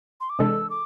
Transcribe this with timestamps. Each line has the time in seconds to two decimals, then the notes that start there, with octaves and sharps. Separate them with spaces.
0.21 C6
0.30 D6
0.39 C3 E3 G#3 D4 A4 E6
0.70 D6